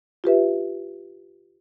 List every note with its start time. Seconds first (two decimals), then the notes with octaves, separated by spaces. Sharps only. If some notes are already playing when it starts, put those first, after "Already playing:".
0.24 F4 G4 B4 E5